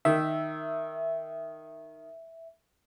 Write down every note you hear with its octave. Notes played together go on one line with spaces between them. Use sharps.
D#3 E5